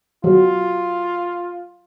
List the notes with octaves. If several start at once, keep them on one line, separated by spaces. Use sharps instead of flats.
F#3 F4